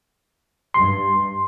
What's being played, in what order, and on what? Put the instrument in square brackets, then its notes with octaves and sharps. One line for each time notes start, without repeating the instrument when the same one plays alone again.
[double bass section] G2 [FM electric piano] C6